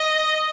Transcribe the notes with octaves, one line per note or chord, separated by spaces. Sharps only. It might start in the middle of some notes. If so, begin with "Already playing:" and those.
Already playing: D#5